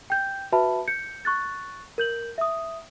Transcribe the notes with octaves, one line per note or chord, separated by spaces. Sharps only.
G5 G6
F#4 B4 E5 A5 B5
G6 C#7
C#6 F#6 A6
A#4 G6 F#7
E5 D#6